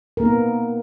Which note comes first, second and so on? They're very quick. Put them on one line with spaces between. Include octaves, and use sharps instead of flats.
A#4 A#3 D#4 B3